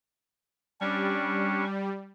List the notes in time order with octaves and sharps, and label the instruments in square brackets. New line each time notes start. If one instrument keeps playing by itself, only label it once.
[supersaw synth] G3 [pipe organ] C#4 D4 C#6